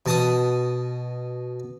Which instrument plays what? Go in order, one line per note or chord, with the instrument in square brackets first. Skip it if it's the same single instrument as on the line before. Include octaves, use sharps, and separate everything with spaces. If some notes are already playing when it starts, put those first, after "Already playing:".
[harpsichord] B2 A5 D#6